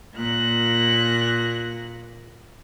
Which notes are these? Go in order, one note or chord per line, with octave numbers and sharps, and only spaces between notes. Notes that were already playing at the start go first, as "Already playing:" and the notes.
A#2 A#3 F#6 A#6